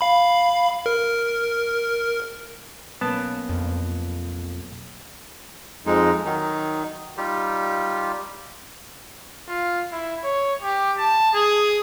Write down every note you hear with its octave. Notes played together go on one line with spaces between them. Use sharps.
F5 B5
A#4
B1 A#3 B3 C#4 A5
F2
F2 G#3 D#4
D#3 F#3 D#4
G3 D#4 F4 G4
F4
E4
C#5
G4
A5
G#4